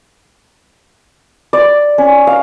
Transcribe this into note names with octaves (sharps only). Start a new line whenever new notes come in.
D5
C#4
F5